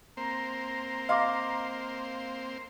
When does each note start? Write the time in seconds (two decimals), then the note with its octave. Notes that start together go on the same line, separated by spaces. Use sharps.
0.17 A#3 C4 C5 A#5
1.09 D#5 F5 C6 D6